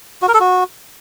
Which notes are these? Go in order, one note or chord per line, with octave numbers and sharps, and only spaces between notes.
F#4
A#4
A4
F#4